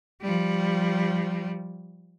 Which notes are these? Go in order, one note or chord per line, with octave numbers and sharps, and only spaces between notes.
F3 G3